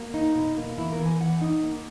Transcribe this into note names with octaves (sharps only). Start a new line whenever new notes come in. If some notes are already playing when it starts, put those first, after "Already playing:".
Already playing: A#3 F#4
D#4
B2
A#3
E3 E4
A#4
E3
G#5
E3 F#5
D#4
A#3